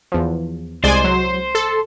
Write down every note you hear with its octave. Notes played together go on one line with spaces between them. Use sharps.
E2 F3
C2 G#3 C5 D5 G#5
F#3
A4